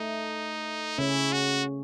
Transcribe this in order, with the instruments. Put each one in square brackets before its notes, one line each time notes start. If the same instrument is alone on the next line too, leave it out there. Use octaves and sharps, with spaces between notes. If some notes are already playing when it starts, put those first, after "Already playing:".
Already playing: [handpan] A3 [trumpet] D#4
[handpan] C#3 C#4 [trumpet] E4
[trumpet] F#4